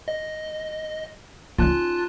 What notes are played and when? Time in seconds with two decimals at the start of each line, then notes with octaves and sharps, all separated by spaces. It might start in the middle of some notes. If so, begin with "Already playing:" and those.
0.08 D#5
1.59 C#4 D#4 F4 A5 F#6